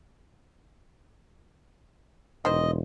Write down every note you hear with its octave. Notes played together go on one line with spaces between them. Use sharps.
E1 D#3 C5 D#5